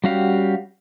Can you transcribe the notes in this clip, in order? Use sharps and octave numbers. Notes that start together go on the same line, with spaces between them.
G3 C#4 F#4 G4 F5